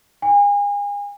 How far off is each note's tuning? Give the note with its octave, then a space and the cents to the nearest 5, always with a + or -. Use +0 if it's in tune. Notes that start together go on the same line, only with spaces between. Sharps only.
G#5 -35